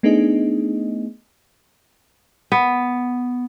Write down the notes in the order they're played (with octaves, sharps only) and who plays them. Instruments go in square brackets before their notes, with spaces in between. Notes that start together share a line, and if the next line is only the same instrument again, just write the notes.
[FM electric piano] A3 B3 D4 D#4 G#4 D#5
[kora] B3